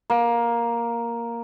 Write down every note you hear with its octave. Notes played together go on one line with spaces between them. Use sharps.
A#3